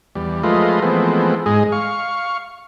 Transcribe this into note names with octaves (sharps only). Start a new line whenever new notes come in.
E2 G3
F3 G#3 A3 F4 B4 D#5
E3 F3 G#3 A3 B3 C4
G#2 G#3 G#4 D#5
F5 C#6